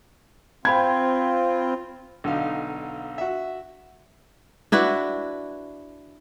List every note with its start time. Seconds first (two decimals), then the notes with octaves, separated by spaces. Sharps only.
0.65 C4 F4 G5 B5 G#6
2.24 B1 D3 D#4 F5
3.18 F#4 E5
4.72 D4 E4 F#4 B4